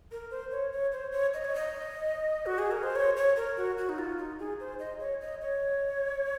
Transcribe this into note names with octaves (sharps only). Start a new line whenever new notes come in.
A#4
C5
C#5
C#5
C5
C#5
D#5
C#5
D#5
F#4
G#4
A#4
C5
C#5
C#5
A#4
F#4
F#4
D#4
F4
D#4
G#4
C5
D#5
C#5
D#5
C#5